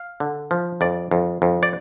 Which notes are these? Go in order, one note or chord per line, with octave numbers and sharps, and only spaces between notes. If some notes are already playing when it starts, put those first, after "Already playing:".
Already playing: F5
D3
F3
F2 D5
F2
F2
D5